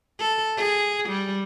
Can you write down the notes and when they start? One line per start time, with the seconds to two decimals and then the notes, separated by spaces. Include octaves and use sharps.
0.19 A4
0.57 G#4
1.09 G3